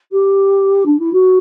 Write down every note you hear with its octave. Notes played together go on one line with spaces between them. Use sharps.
G4
D4
E4
F#4